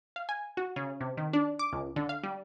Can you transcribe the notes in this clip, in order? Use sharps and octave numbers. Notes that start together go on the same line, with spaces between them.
F5
G#5
F#4
C#3
C3
D#3
D4
D6
C#2
D3
F5
G3